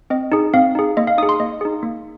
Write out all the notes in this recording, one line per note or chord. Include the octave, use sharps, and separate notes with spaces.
C4 D#5
D#4 G#4
C4 F5
D#4 G#4
A#3 D#5
F5
D#4 G#4 D#6
C6
A#3 D#5
D#4 G#4
A#3